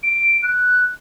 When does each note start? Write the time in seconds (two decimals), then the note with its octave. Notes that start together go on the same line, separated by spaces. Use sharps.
0.03 D7
0.43 F#6